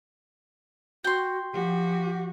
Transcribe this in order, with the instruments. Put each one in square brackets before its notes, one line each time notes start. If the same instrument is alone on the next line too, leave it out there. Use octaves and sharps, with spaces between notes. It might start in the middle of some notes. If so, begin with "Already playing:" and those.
[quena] F#4 [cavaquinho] G5 C6
[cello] F3 F#4 [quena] G4